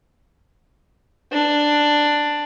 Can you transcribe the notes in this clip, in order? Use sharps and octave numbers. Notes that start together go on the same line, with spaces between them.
D4